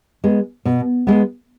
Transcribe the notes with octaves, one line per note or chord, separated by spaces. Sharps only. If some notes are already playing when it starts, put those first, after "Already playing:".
G#3 B3
B2
G#3 B3